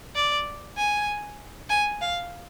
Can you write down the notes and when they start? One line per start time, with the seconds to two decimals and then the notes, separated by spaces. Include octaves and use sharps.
0.15 D5
0.77 G#5
1.69 G#5
2.01 F5